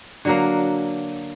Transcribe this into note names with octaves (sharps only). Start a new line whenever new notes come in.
D3 F#3 A#3